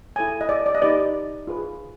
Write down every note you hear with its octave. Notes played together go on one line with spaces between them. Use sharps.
E4 A4 C#5 G#5
D#5
D5
D5
D#5
D#4 G4 B4 D5
F4 G#4 B4